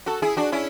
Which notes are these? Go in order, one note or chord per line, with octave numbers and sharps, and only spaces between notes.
F#4 A4
E4 G#4
D4 F#4
C#4 E4